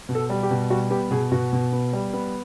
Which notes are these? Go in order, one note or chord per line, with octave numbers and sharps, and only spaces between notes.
B2
A4
G3
G4
B2
G3 F#4
B3 G4
B2 G#4
B2 F#4
B2
B3
G3
B3